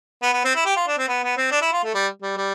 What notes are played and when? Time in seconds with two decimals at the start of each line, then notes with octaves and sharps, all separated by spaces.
0.23 B3
0.33 B3
0.45 C4
0.55 E4
0.65 G4
0.76 F4
0.87 D4
0.98 C4
1.08 B3
1.23 B3
1.37 C4
1.51 D4
1.62 E4
1.72 F4
1.83 A3
1.94 G3
2.22 G3
2.37 G3